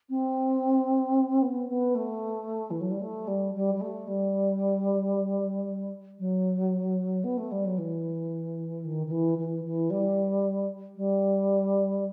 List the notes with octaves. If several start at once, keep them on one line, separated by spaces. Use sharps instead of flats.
C4
B3
B3
A3
E3
F#3
G3
A3
G3
G3
G3
A3
G3
F#3
B3
A3
G3
F#3
E3
D#3
D#3
E3
E3
E3
G3
G3